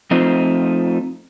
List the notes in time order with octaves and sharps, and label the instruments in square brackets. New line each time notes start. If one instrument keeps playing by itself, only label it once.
[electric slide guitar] F3 A3 C4 D#4 F4 C5